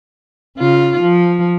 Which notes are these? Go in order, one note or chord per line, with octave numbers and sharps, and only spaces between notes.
C#3 F4
F3